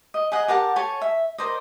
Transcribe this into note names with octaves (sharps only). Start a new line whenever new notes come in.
D#5
G#4 D#5 F#5 A#5
G4 A#4 F#5 A5
A4 C#5 G#5
E5
A#4 C5 D5 D#5